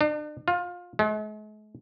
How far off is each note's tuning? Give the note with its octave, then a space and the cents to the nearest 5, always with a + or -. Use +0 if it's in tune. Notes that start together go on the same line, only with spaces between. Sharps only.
D4 +40
F4 +20
G#3 +45